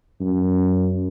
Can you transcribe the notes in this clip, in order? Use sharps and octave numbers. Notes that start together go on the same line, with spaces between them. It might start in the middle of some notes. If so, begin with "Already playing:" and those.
F#2